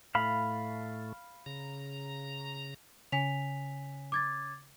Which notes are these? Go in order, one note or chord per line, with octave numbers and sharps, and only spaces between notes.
A2 A3 F5 B5
C#3 A#5
C#3 G#5 B6 F7
D6 G#6 A6